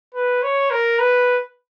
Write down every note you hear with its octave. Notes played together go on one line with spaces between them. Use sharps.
B4
C#5
A#4
B4